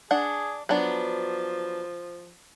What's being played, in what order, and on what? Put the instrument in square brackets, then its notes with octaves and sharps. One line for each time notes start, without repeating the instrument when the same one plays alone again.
[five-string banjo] D4 F#5 [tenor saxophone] G#4
[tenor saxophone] F3 [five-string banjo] F#3 B3 D4